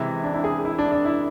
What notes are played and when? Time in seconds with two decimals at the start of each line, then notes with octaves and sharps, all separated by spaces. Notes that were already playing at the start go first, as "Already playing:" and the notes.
Already playing: C3 E3 G#3 E4
0.24 D4
0.33 E4
0.44 G#4
0.65 E4
0.79 D4
0.92 D4
1.05 E4